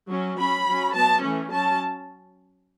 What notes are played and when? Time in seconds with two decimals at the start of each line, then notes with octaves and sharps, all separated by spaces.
0.09 F#3 C#4
0.38 F#3 C#4 B5
0.66 F#3 C#4
0.94 F#3 B3 A5
1.23 E3 A3 C#4
1.52 F#3 C#4 A5